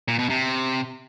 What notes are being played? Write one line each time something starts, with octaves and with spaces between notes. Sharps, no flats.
A#2
B2
C3